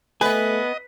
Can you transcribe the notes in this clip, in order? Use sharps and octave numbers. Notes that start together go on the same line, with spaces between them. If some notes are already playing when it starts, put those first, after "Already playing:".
A3 B3 B4 D#5 G#5